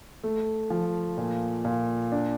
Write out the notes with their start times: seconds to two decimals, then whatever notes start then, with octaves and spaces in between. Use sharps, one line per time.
0.24 A3
0.70 F3
1.17 A#2
1.65 A#2
2.12 D4